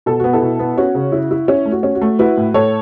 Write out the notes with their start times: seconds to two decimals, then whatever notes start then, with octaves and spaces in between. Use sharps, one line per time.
0.06 B2 A4
0.20 B3 F#4
0.33 E4 A4
0.42 B2
0.59 B3
0.77 C#4 F#4
0.95 C#3
1.12 E4
1.31 E4
1.48 C#4 E4
1.66 A3
1.72 F#4
1.83 C#4
1.95 F#4
2.02 A3
2.19 E4 F#4 B4
2.37 A2
2.54 A2 A4 C#5